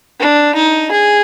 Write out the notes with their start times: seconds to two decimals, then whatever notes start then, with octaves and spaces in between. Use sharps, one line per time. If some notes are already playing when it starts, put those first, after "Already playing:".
0.19 D4
0.55 D#4
0.92 G#4